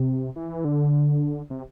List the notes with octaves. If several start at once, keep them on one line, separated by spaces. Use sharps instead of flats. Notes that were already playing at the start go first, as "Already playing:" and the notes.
Already playing: C3
E3
D3
C3